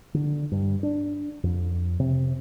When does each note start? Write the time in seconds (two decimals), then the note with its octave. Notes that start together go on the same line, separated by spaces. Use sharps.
0.14 D3
0.52 G2
0.83 D4
1.43 F2
2.00 C3